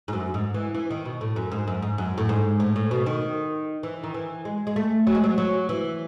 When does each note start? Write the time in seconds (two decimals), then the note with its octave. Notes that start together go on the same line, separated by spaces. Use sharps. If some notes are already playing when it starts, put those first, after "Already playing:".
0.08 G#2
0.13 F#2
0.34 G#2
0.54 E3
0.75 E3
0.90 D#3
1.05 B2
1.21 A2
1.36 F#2
1.51 G#2
1.67 F#2
1.82 G#2
1.98 F#2
2.18 A2
2.29 G#2
2.60 A2
2.76 A2
2.91 B2
3.06 D#3
3.83 E3
4.04 D#3
4.14 E3
4.45 G#3
4.67 G#3
4.76 A3
5.07 F#3
5.15 G#3
5.24 F#3
5.38 F#3
5.69 E3